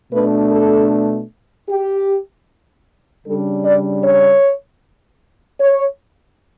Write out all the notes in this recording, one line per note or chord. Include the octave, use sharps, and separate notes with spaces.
B2 A3 D4 B4
A4
G4
C#3 G3 D4 A4
D5
C#5
C#5